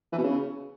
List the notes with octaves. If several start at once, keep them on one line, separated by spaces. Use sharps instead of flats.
E3
B2
C#3